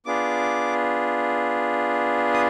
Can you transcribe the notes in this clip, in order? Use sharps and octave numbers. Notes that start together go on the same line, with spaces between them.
B3 D4 F4 G#4 D6
D#6